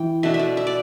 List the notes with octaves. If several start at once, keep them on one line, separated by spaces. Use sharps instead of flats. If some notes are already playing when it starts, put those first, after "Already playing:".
Already playing: E3 G5
B2 A3 D4 E5
E5
D5
E5
D5